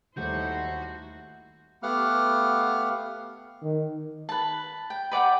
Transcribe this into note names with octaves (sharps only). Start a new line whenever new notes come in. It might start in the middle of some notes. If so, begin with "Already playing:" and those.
D#2 G3 A3 D#4 E4 F#4 C5 G6
A3 B3 G4 F5 F#5 F6
D#3
B4 A5
G5
B4 D5 F#5 G5